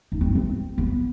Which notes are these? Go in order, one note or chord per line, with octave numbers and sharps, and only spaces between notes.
D#4
C4
C4
B3